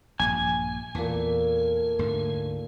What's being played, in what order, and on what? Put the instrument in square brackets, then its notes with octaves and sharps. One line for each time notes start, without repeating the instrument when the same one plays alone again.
[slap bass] A#1 G2 [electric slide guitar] G#5
[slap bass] E2 E3 [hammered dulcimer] A#2 A4
[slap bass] D2 G#2 D3